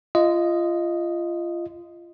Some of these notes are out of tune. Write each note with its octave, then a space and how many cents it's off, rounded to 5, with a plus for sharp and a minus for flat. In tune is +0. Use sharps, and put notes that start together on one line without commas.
F4 -25 D#5 +0